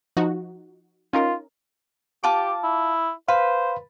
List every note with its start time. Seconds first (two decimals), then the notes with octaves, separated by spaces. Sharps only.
0.17 F3 D#4 F#4
1.13 C#4 D#4 F4 A#4
2.24 F4 G4 A5 D6
2.64 E4
3.28 B4 C5 F5